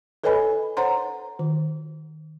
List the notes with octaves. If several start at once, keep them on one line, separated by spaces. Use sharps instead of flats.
A4 B4 C#5 D#5 G#5 B5
C5 C#5 F#5 A#5 C6
D#3